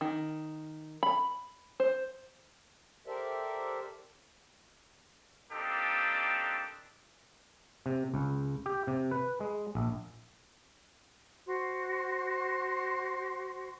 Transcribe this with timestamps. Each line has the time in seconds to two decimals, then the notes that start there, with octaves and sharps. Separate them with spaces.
0.01 D#3
1.03 B5
1.80 C5
3.07 G4 A4 A#4 C5 D5 E5
5.52 A#3 C4 D4 D#4 G4 A4
7.86 C3
8.14 C#2
8.66 G4
8.87 C3
9.11 B4
9.40 G#3
9.75 A#1
11.47 F#4 C5 C6